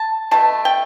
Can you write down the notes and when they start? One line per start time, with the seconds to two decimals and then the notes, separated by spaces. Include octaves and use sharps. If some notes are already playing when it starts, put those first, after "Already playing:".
Already playing: A5
0.31 B2 A3 A5
0.65 G5